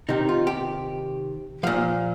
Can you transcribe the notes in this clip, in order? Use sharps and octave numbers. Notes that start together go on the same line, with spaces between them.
C3 D#3 D#4
F4
G4
A#2 F3 F5